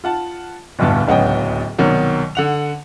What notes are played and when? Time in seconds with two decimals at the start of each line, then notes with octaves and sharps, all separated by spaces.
0.04 F4 F#5 A5
0.79 D1 G1 G2 B2 A5
1.07 D1 C#2 F#3 B3 D#5 G5
1.78 C2 B2 D#3 F#3
2.35 D3 F#5 F7